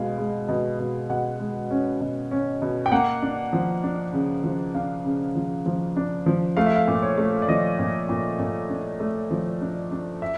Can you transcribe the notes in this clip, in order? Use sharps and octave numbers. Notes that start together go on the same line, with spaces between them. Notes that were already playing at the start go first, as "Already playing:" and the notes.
Already playing: B2 G#3 F5
G#3
B2
B2
B2 F#5
G#3
C#4
B2
C#4
B2
G5
A#3 F#5
D4
F3
D4
C#3
F3
D4 F5
C#3
F3
F3
D4
F3
A3 F5
E5
F5
A#2
C#5
A3
D5
F3 D#5
A#2
A#2
A#2
D4
A3
F3
D4
D4
E5